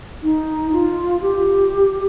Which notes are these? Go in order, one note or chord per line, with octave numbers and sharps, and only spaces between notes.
D#4
F4
G4